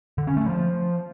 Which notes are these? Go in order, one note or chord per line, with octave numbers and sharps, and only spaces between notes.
D3
C#4
A3
F3